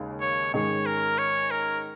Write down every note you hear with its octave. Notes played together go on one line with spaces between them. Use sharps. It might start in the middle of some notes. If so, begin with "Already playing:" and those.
Already playing: D#2 C#3 G#3
C#5
G#2 D#3 G#3 C#4 G#4 C#5
A#4
C#5
A#4